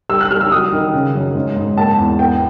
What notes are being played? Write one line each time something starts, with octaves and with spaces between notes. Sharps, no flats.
G3 E6
F#6
G3 F6
E6
F#3 D#6
D#3
C#3
F#2
G#2
G#2
A#3 A5
E2
B3 G5